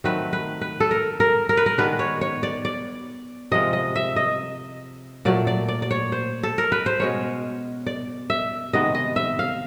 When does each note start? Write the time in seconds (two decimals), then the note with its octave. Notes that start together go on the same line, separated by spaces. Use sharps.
0.04 D#3 F#3 A3 C4 B4
0.33 B4
0.61 B4
0.80 A4
0.91 A#4
1.20 A#4
1.49 A#4
1.57 B4
1.66 A#4
1.78 D#3 G#3 B3 D4 B4
1.99 C#5
2.21 C#5
2.43 D5
2.65 D5
3.51 C3 F3 G#3 D#5
3.73 D#5
3.96 E5
4.16 D#5
5.25 A#2 F#3 A3 D5
5.47 D5
5.68 D5
5.82 D5
5.91 C#5
6.12 C5
6.43 A4
6.58 A#4
6.72 B4
6.86 C5
6.99 B2 G#3 C#4 C#5
7.86 D5
8.30 E5
8.73 C3 D#3 G#3 B3 D#5
8.95 D#5
9.16 E5
9.39 F5